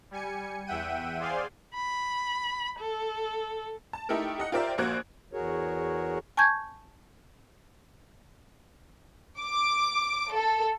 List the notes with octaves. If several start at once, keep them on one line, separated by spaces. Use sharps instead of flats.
G3 G#5 C#7
E2 E5 F#5 G5 D#7
G#4 C5 D5 F5 G#5 C6
B5
A4
A5
A3 D#4 E4 G4 A4 A#4
G4 D#5 F#5
F4 G4 A#4 C5 D5 E5
A#1 A#3 F#4 C5 F#6 G#6
E2 F#4 G#4 A#4 C#5
G#5 A5 C#6 G6 G#6
D6
A4